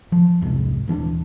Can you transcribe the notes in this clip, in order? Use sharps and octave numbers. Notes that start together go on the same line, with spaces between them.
F3
E1 C2 G#2
D#1 E3 C#4 D4